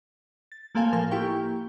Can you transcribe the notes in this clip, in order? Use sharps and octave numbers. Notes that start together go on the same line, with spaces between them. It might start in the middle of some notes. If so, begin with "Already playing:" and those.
A6
A3 A#3 C4 A4 F5 G#5
A2 F3 A4 A#4 C6 F6
A#3 E4 G4 G5 C#6